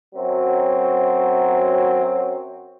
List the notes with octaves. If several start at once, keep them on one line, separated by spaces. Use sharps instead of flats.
F#2 F#3 C4